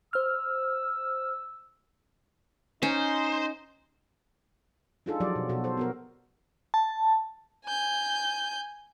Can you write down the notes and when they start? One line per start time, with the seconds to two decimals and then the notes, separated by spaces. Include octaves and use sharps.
0.13 C5 E6 F6
2.83 C#4 D#4 C5
5.06 D4 D#4 F4 G#4 A4
5.20 F3 F#3 G4 D5
5.36 B2
5.49 B2 F#4 A4
5.64 A4 C5
5.77 B3 F#4 A#4
6.74 A5
7.65 G#5 G6